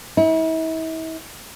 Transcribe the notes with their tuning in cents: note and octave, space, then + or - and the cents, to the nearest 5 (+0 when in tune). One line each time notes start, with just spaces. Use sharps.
E4 -40